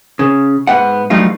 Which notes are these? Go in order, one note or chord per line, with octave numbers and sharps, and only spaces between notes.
C#3
G#2 B3 F#5
G2 F3 F#3 A3 D#4 F4